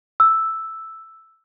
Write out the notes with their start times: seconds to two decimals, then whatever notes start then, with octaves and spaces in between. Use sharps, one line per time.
0.20 E6